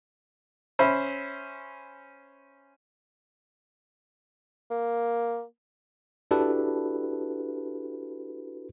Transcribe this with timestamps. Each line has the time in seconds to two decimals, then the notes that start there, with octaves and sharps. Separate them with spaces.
0.79 C#4 C5 E5 B5
4.71 A#3
6.31 D4 E4 F#4 G4 A4 B4